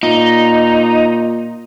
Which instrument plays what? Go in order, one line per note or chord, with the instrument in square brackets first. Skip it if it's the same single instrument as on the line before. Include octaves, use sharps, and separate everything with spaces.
[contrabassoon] A#2 [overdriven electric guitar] D#4